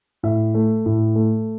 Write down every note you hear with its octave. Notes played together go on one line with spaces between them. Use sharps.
A2 E5
A3
A2
A3